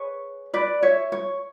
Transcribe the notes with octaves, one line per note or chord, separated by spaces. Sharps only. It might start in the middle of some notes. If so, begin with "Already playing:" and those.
Already playing: G#4 B4 C#5
B4 D5
C#5 E5
C#5